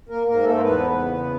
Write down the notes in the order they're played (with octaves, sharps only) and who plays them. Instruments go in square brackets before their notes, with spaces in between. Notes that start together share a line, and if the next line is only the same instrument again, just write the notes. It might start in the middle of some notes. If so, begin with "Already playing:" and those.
[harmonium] A#3 A#4
G#2 A#3 A#4
A3 A4
C5
E2 B3 B4
C#3